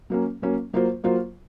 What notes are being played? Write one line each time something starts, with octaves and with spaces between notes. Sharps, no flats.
F#3 A#3 C#4
F#3 A#3 C#4
F#3 A#3 F4 C5
F#3 A#3 F4 C5